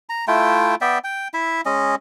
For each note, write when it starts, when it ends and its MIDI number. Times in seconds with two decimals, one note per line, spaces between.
0.09 0.25 82
0.28 0.75 57
0.28 0.75 64
0.28 0.75 65
0.28 0.75 79
0.81 0.99 59
0.81 0.99 74
0.81 0.99 76
0.81 0.99 79
1.04 1.28 79
1.34 1.61 64
1.34 1.61 76
1.66 1.95 56
1.66 1.95 61
1.66 1.95 75